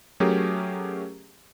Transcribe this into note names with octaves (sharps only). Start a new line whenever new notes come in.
F#3 A3 C#4 G4 G#4 A#4